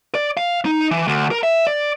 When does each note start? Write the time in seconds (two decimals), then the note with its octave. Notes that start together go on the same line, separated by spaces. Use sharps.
0.15 D5
0.37 F5
0.65 D#4
0.91 E3
1.08 D2
1.31 A#4
1.43 E5
1.67 D5